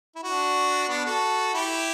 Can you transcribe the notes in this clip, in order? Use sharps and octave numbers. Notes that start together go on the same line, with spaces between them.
E4
D4 F#4
B3 D4
F#4 A4
E4 G4